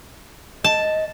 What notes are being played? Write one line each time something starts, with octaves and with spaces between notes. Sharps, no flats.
D#5 A5